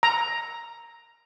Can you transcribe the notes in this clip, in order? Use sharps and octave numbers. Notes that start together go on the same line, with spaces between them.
A#5